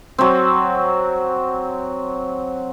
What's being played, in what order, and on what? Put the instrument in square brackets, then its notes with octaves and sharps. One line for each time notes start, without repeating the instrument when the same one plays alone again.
[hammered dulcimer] F#3 C4